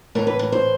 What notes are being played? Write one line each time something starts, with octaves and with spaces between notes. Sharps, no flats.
A2 E3 A#4
B4
A#4
C5